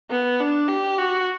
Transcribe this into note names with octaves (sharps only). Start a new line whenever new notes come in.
B3
D4
G4
F#4